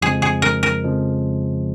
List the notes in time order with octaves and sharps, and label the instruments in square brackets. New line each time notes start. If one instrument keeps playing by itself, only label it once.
[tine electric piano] F2 C#3 F3 G#3 [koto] G#4
[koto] G#4
A#4
A#4
[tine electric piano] F2 C#3 F3 G#3